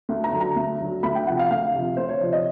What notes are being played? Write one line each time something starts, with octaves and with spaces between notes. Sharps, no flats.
D2
A#5
D3 F#3
A#5
D2
D3 F#3
D2 B5
G5
C3 F3 F#5
F5
D2 F5
C3 F3
D2 C5
C#5
C3 F3 D5
D#5